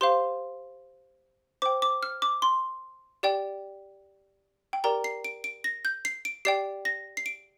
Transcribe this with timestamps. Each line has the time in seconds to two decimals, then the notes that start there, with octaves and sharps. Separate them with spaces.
0.01 G4 C5 F5 C6
1.62 C5 G5 D6
1.82 D6
2.03 F6
2.22 D6
2.42 C6
3.23 G4 D5 G5
4.73 G5
4.84 G4 A#4 D5 G5 A#5
5.04 C7
5.24 D7
5.44 D7
5.64 A#6
5.85 G6
6.05 C7
6.25 D7
6.45 G4 D5 G5 C7
6.85 A#6
7.17 C7
7.26 D7